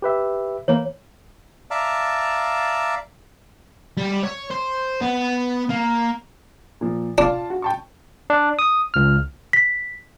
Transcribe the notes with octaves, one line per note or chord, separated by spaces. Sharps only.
G4 B4 E5
E3 A#3 C#5
D5 E5 F5 A5 A#5
G3
C#5
C5
B3
A#3
A#2 F3
D4 F4 F5 A5
F#4
G5 A5 C#6
D4
D#6
C#2 F6
B6